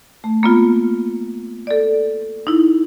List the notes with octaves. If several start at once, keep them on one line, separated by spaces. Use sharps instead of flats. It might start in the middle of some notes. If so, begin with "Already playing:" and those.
A3
A#3 B3 F4
A4 D5
D#4 E4